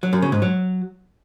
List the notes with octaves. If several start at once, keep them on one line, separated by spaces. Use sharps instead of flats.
F#3
F#2
C#3
G#2
F#3